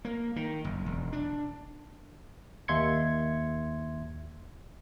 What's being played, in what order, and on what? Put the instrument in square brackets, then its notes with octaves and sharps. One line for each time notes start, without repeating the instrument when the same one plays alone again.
[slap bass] A#3
D#3
F#1
E1
D4
[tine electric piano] D#2 E5 C6 G#6 C#7